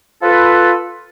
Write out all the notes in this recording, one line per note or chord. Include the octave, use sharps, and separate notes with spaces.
F4 A4 B4